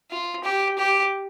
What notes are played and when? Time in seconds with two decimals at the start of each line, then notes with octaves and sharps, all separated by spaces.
0.11 F4
0.44 G4
0.78 G4